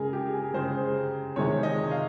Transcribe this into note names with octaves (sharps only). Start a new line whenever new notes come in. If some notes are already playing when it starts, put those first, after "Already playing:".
Already playing: C#3 G#3 G#4 A#4
G4
G#4
C#3 G#3 C5
C3 D#3 G#3 C#5
D#5
F5